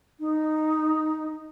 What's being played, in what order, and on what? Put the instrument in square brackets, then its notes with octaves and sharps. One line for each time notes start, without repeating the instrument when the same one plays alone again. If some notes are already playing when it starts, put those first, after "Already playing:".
[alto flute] D#4